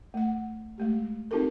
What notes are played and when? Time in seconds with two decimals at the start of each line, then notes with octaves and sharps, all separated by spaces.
0.14 A3 F#5
0.78 G#3 A3 G4
1.31 C4 D#4 F4 G4 A4 A#4